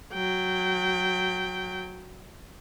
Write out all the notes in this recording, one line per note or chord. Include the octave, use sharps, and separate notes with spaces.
F#3 G5